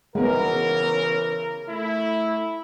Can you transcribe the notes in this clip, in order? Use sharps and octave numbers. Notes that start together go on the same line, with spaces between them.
C#3 E3 G#3 B3 A#4
A3 E4